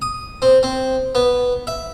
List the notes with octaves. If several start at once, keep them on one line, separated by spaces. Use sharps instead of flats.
D#6
C4
C4
B3
E5